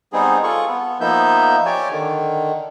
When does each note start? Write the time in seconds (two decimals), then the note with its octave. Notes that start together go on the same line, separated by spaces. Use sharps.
0.13 G3 B3 C4 D#4 G#4
0.43 F4 G#4 A4 C#6
0.68 B3
1.01 F3 A#3 B3 D#4 E5 G6
1.66 G4 C#5 D5 G#5
1.91 D3 D#3